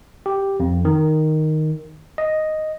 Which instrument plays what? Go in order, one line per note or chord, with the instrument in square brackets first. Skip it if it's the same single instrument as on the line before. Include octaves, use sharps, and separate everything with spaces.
[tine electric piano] G4
F2
D#3
D#5